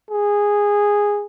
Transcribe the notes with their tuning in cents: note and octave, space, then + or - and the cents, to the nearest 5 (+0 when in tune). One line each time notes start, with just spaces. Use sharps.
G#4 -10